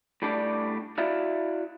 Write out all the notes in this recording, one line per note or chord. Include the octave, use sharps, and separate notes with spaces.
A2 G3 D4 G4
E4 F#4 D5 E5 F5